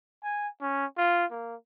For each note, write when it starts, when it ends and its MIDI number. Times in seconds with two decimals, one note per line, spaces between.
0.23 0.48 80
0.61 0.85 61
0.97 1.25 65
1.31 1.55 58